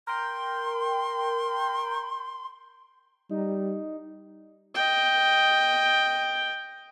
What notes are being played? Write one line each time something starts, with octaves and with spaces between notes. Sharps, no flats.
A#4 G5 C6
G3 D#4
D#5 G5